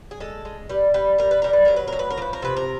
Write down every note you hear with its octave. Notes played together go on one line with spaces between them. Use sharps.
G#4
G#3 A4
G#3
G3 B4
G3 B4
G3 A#4
B4
G3 A#4
B4
F#3 A#4
B4
A2 A#4
B4
A#4
F3 B4
A#4
C3 B4
A#4